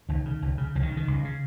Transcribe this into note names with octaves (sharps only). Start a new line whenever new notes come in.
C#2 D#3
C#3
C#2
C#3
C#2 F3
D#3
C#3
D#3
C#2
C#3